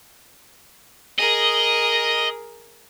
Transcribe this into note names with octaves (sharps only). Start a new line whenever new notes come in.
G#4 A#4 D#5